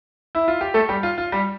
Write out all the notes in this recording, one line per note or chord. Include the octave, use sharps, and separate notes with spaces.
E4
F4
G4
A3 A4
G3 G4
F4
F4
G3 G4